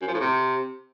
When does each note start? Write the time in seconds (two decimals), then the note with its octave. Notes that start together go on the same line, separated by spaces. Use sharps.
0.02 F#2
0.08 F3
0.14 A2
0.20 C3